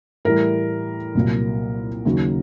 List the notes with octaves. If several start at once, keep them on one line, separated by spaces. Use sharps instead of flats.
A2 E3 G3 A#4
C2 A#2 F#3
D#2 C#3 F#3